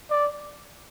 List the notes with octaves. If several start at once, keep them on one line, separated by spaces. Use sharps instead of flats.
D5